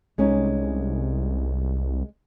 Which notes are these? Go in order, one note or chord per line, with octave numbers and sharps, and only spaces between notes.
C2 G#3 C#4 D#4